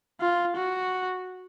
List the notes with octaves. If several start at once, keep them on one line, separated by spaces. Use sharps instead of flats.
F4
F#4